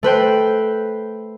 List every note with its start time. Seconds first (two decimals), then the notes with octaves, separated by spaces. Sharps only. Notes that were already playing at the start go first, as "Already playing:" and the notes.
0.03 A3 B4 C5 G5